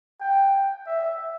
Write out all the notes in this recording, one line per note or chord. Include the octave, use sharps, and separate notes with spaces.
G5
E5